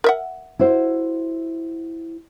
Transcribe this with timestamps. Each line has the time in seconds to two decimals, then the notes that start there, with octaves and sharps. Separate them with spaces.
0.04 A#4 E5 F#5
0.59 E4 F#4 C5